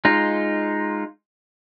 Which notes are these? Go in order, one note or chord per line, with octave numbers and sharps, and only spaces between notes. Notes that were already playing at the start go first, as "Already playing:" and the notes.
G#3 D#4 F4